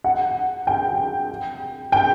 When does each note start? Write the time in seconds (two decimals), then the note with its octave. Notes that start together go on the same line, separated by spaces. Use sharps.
0.04 F#5
0.67 G5
1.92 G5